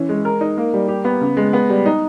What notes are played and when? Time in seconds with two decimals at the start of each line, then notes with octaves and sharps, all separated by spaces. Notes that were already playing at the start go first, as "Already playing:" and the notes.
Already playing: E3 C#4
0.09 G#3
0.25 A#4
0.41 D#4
0.58 A#3
0.74 G3
0.88 G4
1.05 B3
1.21 C#3
1.37 G#3
1.53 B3
1.70 G3
1.86 D#4